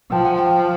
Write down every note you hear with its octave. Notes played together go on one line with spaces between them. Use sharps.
F3 G5 A5
F#5 G#5
G5 A5